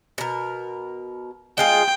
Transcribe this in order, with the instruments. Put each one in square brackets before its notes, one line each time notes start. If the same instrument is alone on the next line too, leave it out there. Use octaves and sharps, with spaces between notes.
[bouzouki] B2 A#4
[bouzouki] G#3 F4 G#4 [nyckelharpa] G5